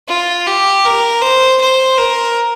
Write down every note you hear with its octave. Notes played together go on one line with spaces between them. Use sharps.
F4
G4
A#4
C5
C5
A#4